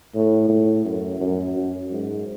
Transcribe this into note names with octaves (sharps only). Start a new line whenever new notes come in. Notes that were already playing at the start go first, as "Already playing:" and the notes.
A2
A2
F#2
F#2
F#2
G#2